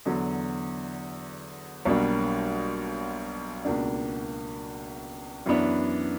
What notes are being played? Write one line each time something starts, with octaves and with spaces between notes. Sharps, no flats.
E2 D3 F#3
B1 B2 G3 A#3 D4
C#2 B2 A#3 D4
F#2 E3 B3 D4